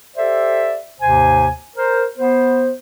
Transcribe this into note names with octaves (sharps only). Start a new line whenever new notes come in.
G4 A4 C5 D5 E5
D#2 G#2 C3 C5 G#5
A#4 C5
B3 C5